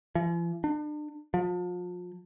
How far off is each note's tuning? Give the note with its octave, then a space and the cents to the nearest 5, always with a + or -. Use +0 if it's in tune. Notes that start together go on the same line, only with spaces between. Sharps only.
F3 -45
D4 +35
F3 +35